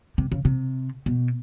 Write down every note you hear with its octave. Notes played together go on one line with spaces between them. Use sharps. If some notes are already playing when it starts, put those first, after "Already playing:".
C3
C#3
C3
B2